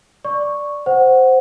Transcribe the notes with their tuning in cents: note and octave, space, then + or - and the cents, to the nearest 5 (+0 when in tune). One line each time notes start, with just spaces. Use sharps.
D5 +0 C#6 +0
C5 -5 F#5 +0